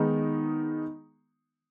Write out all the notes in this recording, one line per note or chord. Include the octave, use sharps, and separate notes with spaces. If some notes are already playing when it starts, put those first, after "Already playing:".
Already playing: D#3 G#3 B3 D#4